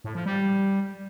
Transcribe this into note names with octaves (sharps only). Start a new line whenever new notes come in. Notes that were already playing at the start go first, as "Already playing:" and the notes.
A2
F3
G3